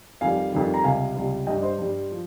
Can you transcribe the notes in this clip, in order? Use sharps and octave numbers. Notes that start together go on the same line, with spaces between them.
F2 D#3 G3 F5 G#5
F2 D#3 G3
A#5
C#2 C3 G3 F5 G#5
C#2 C3 G3
G2 G3 D#5 G5
C5 D#5
G2 G3
F3